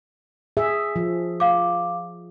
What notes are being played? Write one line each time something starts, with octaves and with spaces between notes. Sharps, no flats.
G#4 E5
F3
F5 D6